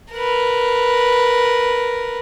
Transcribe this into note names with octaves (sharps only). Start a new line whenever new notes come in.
A#4 B4